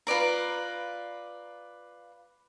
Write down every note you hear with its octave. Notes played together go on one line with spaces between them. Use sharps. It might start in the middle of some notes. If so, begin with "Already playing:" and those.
F4 B4 D5 A#5